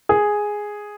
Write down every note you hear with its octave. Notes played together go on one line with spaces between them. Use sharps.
G#4